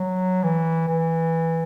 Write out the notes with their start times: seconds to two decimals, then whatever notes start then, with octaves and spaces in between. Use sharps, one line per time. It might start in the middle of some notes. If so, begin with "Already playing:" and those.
Already playing: F#3
0.43 E3
0.88 E3